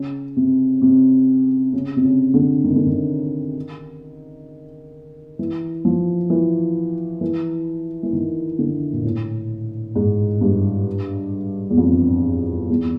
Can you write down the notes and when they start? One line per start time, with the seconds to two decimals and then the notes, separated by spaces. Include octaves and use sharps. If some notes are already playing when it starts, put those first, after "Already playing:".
Already playing: C#3
0.36 C3
0.82 C3
1.73 C#3
1.96 C3
2.04 C#3
2.34 D3
2.64 D#3
2.76 D3
2.87 D#3
5.39 E3
5.85 F3
6.30 E3
7.21 E3
8.03 E3
8.13 D#3
8.59 D3
8.93 A#2
9.04 A2
9.95 G#2
10.41 G2
11.71 E2
11.78 F2
12.70 E2